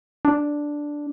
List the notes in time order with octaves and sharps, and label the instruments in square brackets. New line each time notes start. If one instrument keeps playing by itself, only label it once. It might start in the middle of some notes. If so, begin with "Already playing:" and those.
[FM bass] D4